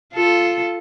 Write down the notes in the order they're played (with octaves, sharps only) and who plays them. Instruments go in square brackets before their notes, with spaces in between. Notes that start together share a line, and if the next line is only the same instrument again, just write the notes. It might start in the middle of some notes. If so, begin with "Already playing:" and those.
[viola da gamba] F4 A4